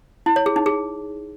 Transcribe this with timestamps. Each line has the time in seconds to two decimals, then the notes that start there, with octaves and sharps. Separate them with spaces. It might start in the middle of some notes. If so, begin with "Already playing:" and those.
0.26 E4
0.36 C#5
0.46 G#4
0.56 D#4
0.66 G#4